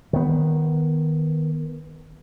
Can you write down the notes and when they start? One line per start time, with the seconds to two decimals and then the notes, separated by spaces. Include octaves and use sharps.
0.13 D#3 B3